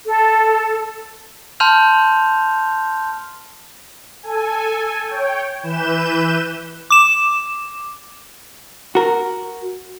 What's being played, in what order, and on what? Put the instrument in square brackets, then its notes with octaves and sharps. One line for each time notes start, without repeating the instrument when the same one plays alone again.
[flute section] A4
[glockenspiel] A5 C6 F6 G6 F7
[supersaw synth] A4 G#5
C#5 G5
E3 B4 G6 E7
[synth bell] D6 E7
[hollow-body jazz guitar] F#4 A#4